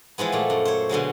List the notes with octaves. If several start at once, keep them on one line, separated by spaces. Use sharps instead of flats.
E3 F3 G#3 B3
A#2 A3
F#2
C5 C#5
B2 D3 F#3 G#3